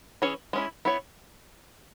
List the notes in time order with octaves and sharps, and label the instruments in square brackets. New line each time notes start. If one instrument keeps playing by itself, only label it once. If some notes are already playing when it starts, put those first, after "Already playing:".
[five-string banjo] E3 C#4 G#4 C#5
G#3 C#4 E4
B3 E4 C#5